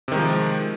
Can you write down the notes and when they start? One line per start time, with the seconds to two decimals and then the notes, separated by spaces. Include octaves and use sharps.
0.08 C3
0.12 D#3
0.15 G#3
0.19 F3